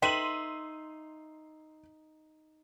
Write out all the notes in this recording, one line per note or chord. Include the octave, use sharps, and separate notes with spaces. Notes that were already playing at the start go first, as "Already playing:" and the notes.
D#4 A4 B4 E5 G5 C6 D#7 F#7